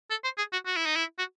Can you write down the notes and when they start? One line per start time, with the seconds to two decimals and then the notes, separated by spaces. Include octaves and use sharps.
0.11 A4
0.24 C5
0.38 G#4
0.53 F#4
0.66 F#4
0.77 E4
0.86 D#4
0.96 E4
1.19 F#4